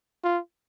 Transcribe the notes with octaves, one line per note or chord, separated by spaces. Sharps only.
F4